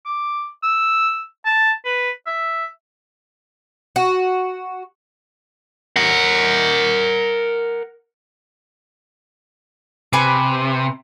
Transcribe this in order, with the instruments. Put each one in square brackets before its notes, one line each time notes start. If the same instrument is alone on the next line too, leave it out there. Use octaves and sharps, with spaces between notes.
[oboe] D6
E6
A5
B4
E5
[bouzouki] F#4
[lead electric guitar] A#4 F#5
[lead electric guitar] C3 [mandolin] B4 G#5 D6